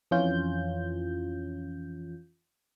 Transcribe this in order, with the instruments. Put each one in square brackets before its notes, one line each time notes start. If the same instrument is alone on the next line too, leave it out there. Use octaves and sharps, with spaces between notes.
[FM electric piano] F2 E3 C#4 F4 G6